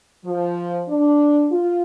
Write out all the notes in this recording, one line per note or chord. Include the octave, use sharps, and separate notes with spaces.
F3
D4
F4